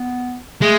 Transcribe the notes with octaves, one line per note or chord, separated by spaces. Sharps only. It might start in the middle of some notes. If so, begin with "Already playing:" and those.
Already playing: B3
G#3 A3